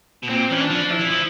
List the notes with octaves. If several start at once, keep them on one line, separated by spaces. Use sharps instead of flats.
B2
A#2 C4
E3 C#4
D4
F3
E4
E3
F3